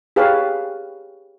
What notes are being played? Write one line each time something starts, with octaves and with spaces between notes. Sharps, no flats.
G4 G#4 B4 C#5 F5 A5